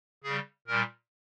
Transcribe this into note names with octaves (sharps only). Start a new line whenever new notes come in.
C#3 G3 G#4
A#2 G3 A#4